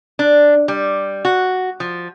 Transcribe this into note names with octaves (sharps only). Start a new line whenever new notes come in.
D4
G3
F#4
F3